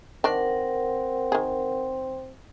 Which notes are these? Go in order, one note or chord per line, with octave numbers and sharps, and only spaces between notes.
D#3 C4 D4 A#4 F#5
D#3 G#4